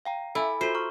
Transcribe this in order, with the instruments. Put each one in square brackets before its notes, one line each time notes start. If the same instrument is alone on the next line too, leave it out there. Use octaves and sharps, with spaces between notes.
[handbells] F5 G5 A#5
[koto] E4 [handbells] A4 E5 G#5
[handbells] F4 F#4 A4 [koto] C5
[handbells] A#5 C#6 F6